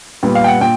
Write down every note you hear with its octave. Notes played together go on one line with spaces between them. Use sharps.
A#2 G3 B3
F5
G5
F#5
A#2 G5